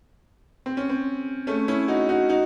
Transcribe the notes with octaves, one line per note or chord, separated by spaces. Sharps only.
C4
C#4
C4
A3 C#4
C#4 E4
D#4 F#4
D#4 F#4
D#4 F#4